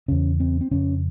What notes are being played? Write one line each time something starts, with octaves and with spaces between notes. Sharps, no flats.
E2 C#3 C#4
C4
C4
F2 C#3 C#4